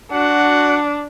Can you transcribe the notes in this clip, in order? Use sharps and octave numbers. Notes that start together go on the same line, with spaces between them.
D4 F#4 F#5